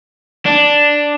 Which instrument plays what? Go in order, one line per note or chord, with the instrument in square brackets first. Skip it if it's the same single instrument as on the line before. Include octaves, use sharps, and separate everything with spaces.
[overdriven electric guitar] D4